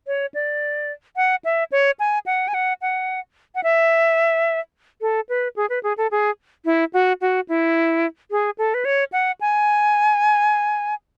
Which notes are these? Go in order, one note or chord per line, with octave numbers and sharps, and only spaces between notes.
C#5
D5
F#5
E5
C#5
G#5
F#5
G#5
F#5
F#5
F#5
E5
A4
B4
G#4
B4
G#4
A4
G#4
E4
F#4
F#4
E4
G#4
A4
B4
C#5
F#5
G#5